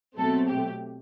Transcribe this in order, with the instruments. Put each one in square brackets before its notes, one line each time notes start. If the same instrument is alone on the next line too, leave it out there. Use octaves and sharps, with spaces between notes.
[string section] B2 F#3 A3 C4 A4
G4